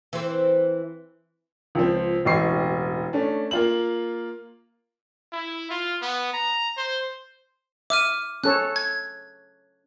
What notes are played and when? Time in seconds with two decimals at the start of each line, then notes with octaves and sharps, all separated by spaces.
0.13 E3 C4
1.75 C#2 F3 C4
2.25 E1 A1 D#5 C#6 C7
3.13 A3 C#4 D4
3.51 A#3 F4 F#7
5.32 E4
5.70 F4
6.02 B3
6.33 A#5
6.77 C5
7.90 E5 D6 F6 D#7
8.44 C#4 A4 C#5 F#6
8.76 G#6